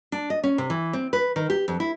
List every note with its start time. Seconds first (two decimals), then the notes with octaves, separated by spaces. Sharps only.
0.12 D4
0.30 D#5
0.44 C#4
0.58 C3
0.70 E3
0.93 C4
1.13 B4
1.36 D#3
1.50 G4
1.68 F2
1.80 E4